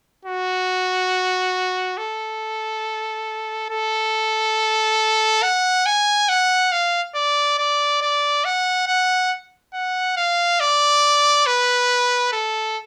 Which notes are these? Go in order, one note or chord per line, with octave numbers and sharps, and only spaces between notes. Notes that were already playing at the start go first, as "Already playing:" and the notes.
F#4
A4
A4
F#5
G#5
F#5
F5
D5
D5
D5
F#5
F#5
F#5
F5
D5
B4
A4